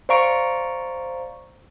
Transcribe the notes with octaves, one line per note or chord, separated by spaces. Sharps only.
C5 D5 F5 A#5 C#6 D7